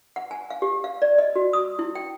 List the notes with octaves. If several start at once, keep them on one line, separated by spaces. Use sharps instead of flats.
F#5
G#5
F5
G4
F5
D5
D#5
F#4
D#6
E4
G5